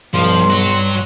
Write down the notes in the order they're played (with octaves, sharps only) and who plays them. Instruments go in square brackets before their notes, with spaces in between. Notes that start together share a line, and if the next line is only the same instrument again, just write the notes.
[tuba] B1 [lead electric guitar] G2 [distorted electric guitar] F3 [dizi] C6
[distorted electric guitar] F#4 C#5